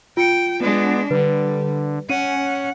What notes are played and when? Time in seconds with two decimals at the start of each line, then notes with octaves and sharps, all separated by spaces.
0.17 F4 G5 C#7
0.61 G#3 B3 D4
1.11 D3 G3 B4
2.10 C#4 F#5 D#7